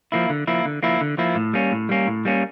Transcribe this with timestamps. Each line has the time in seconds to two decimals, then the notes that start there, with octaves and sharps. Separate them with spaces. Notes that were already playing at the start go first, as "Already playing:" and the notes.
0.12 F3 A#3 E4
0.30 D3
0.47 F3 A#3 E4
0.65 D3
0.83 F3 A#3 E4
1.01 D3
1.18 F3 A#3 E4
1.35 A2
1.53 G3 A#3 C#4
1.72 A2
1.89 G3 A#3 C#4
2.07 A2
2.25 G3 A#3 C#4